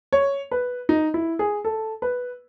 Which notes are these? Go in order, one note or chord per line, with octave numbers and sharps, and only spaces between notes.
C#5
B4
D#4
E4
G#4
A4
B4